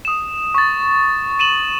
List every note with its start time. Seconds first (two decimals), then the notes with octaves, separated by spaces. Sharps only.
0.05 D#6 E7
0.55 C#6 A6
1.39 D#7 E7 F#7